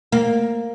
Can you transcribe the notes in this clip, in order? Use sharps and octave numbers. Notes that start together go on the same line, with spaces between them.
A#3